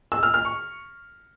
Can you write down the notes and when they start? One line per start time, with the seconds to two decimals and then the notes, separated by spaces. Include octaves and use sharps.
0.12 E6
0.23 F6
0.34 F6
0.45 C#6